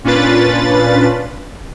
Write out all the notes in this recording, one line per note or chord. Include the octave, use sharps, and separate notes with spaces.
A#2 C#4 D4 F4 B4 A6